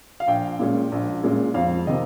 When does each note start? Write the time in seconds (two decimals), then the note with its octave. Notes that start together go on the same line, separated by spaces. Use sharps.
0.20 F5
0.27 A#1 G5
0.59 A#2 G#3 C#4
0.92 A#1
1.23 A#2 G#3 C#4
1.54 F2 F5
1.87 C3 D#3 D#5